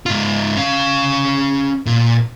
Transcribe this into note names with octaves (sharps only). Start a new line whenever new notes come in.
G#2 F4
C#4 F5
A#2